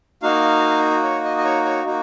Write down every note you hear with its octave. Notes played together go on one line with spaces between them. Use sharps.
A#3 D#4 F#4 F5
C#5
D#5
D#5
C#5
C#5
A#3 D#4 F#4